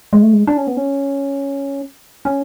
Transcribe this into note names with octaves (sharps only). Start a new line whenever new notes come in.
G#3
A3
G#3
D4
C#4
B3
C#4
C#4